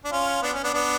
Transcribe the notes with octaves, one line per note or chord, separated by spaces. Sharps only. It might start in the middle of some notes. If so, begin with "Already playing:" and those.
D4
C#4 F4
B3 D4
C#4
B3 D4
B3 D4